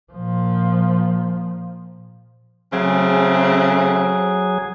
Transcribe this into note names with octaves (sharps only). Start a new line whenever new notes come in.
A#2 F3
C#3 F#3 A3 C4 G#4